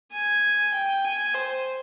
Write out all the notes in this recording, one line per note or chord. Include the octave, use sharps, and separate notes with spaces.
G#5
G5
G#5
C5